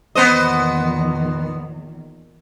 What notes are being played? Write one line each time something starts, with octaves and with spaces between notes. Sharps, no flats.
E2 A#2 D#3 B3 C5 D#5